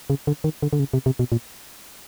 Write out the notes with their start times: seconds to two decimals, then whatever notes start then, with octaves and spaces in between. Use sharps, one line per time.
0.10 C#3
0.27 D3
0.44 D#3
0.62 D3
0.73 D3
0.79 C#3
0.93 C3
1.06 C3
1.19 B2
1.32 A#2